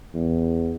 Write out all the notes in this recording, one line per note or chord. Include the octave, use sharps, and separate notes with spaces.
E2